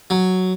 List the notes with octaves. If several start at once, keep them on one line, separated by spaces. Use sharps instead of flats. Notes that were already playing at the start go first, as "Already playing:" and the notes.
F#3